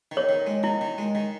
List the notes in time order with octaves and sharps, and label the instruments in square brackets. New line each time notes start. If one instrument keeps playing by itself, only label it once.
[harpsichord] D#3
[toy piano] C#5
[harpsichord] D#3
G#3
[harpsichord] D#3 [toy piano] E4
[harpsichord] D#3
G#3
D#3